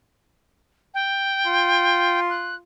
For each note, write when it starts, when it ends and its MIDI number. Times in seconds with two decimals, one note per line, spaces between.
0.94 2.20 79
1.46 2.61 65
2.30 2.55 90